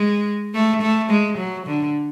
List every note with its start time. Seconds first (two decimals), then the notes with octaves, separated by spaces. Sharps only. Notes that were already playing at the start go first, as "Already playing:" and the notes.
Already playing: G#3
0.54 A3
0.82 A3
1.10 G#3
1.38 F#3
1.67 D3